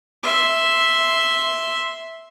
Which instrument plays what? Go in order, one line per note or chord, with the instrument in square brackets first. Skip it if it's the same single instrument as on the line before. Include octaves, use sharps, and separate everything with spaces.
[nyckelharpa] E5 C6